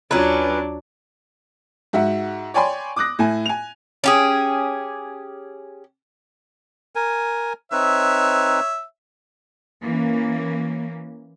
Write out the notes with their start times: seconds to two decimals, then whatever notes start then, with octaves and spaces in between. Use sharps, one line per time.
0.11 D#2 F#3 C#4 D4 F4 B4 A#5
1.93 G#2 F#4 E5 F#5
2.54 C#5 D5 G5 G#5 B5 C6
2.96 D6 D#6 F#6 A#6
3.19 A2 E4 G#5
3.46 G#5 F7
4.04 C#4 G4 G#4
6.95 A#4 G#5
7.72 C4 D#4 B4 C#5 E5
9.82 E3 A#3 C#4